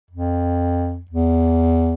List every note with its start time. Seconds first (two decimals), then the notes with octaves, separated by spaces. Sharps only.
0.11 F2
1.11 E2